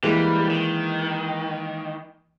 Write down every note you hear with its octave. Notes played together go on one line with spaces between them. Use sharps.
E3 G3 G#3 A#3
D#3